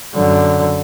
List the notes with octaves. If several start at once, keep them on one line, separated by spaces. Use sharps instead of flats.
F#2 D3